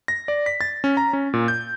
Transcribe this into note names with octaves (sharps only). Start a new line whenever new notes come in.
A#6
D5
B6
A6
C#4
A#5
C#4
A#2
G6